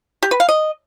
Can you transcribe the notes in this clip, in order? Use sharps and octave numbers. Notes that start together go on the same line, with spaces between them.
G4
B4
F5
D#5